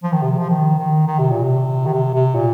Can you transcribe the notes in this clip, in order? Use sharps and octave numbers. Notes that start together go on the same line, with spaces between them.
F3
D#3
C3
F3
D#3
D#3
D#3
C3
A#2
C3
D#3
C3
C3
A#2